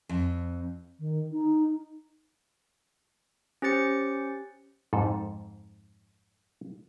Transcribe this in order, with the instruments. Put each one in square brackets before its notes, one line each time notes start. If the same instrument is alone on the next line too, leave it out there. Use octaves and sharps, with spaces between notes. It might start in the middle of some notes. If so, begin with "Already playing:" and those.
[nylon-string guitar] F2
[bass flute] D#3
D#4
[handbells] C#4 G4 C5 A6 C#7
[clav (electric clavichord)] F2 G#2 A4